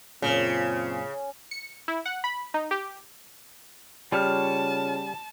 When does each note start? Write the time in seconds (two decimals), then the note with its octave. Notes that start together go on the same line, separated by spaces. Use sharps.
0.22 F#2 A#2 C#3 C4 F4
1.51 C#7
1.88 E4
2.06 F#5
2.24 B5
2.54 D#4
2.71 G4
4.12 C#3 G3 F4 C#5 A5 F6